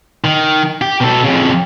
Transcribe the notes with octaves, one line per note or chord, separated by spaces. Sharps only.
D#3
G4
B2 A4
F2 C#3